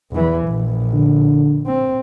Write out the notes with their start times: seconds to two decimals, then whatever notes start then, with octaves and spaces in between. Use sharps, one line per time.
0.12 E2 E3
0.47 A#1
0.93 D3
1.66 C4